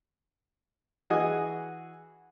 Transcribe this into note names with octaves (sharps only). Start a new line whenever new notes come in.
E3 F#4 G#4 D#5 G#5